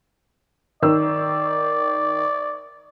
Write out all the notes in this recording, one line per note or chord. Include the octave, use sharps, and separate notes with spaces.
D#3 D5 E6